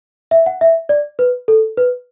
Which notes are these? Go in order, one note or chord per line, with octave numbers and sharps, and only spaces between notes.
E5
F#5
E5
D5
B4
A4
B4